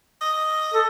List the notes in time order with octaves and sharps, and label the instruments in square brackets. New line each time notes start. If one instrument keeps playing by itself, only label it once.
[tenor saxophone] D#5
[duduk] A4